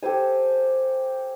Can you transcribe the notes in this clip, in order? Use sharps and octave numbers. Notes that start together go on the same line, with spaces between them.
G4 A4 C5 G#5